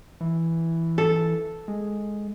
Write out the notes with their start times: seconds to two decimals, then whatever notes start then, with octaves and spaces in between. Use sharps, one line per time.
0.21 E3
0.98 A4
1.68 G#3